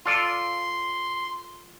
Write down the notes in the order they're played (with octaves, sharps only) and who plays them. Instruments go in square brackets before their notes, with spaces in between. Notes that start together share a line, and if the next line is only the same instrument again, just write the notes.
[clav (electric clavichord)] F4 A4 D5 [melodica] C6